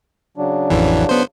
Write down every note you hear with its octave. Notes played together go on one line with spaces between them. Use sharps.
C#3 F#3 D4
A1 F2 E3
B3 C5